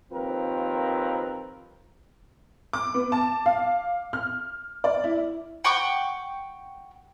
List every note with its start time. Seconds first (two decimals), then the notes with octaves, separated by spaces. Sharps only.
0.12 D#2 F3 C4 A#4 B4
2.73 D6
2.94 B3
3.12 A5
3.46 F5
4.13 F6
4.84 D5
5.04 E4
5.64 F#5 G5 C#6 D6